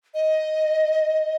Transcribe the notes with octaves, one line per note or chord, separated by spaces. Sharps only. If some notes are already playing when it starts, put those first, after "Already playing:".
D#5